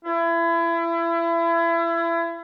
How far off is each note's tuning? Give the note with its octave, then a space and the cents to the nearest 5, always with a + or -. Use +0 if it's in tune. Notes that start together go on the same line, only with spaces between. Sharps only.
E4 +30